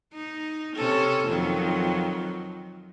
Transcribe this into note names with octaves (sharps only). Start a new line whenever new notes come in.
D#4
C3 C#4 A4
F2 D#3 F#3